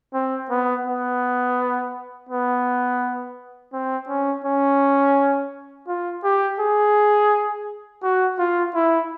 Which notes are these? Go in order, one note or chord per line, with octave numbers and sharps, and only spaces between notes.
C4
B3
B3
B3
C4
C#4
C#4
F4
G4
G#4
F#4
F4
E4